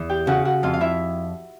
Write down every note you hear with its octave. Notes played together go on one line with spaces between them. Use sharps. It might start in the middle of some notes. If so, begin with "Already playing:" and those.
Already playing: E2
G4 G5
C#3 F#4 F#5
F#4 F#5
F2 F4 F5
F5
E4 E5